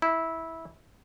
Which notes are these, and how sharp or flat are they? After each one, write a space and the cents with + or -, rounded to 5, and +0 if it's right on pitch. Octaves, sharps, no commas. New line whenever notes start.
E4 -15